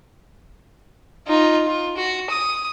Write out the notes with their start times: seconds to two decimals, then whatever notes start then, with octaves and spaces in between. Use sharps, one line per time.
1.27 D#4 F4
1.66 F4
1.96 F#4
2.30 D#6